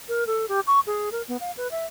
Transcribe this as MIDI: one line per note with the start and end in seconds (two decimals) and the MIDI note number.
0.08 0.27 70
0.27 0.46 69
0.49 0.60 67
0.67 0.80 85
0.87 1.10 68
1.12 1.22 70
1.28 1.37 59
1.40 1.51 77
1.57 1.70 71
1.71 1.86 76